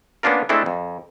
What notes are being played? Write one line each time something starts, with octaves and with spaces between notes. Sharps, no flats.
A#3 B3 C#4 D4 F4 A#4
G#3 A3 C4 D4 E4 A4
F2